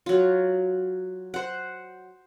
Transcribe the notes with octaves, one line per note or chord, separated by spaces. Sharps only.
F#3 F4
C5 F#5